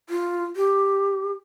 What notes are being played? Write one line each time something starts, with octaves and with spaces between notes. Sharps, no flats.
F4
G4